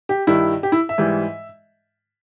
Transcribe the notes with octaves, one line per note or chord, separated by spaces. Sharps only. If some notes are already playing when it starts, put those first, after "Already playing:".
G4
G2 D#3 G3 E4
G4
E4
E5
G#2 E3 G3